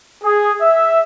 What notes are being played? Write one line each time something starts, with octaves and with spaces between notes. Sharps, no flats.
G#4
E5